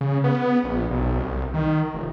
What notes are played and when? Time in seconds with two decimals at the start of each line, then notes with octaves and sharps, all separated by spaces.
0.01 C#3
0.24 B3
0.64 A#1
0.91 B1
1.18 C2
1.54 D#3
1.94 F1